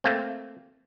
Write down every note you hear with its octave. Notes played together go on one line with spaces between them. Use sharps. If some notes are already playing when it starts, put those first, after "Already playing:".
A3 A#3 C4